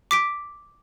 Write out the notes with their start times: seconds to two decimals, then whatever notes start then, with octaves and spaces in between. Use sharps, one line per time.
0.11 D6 B6 D7